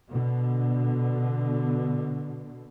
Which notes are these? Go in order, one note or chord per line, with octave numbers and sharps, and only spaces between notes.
B2 D3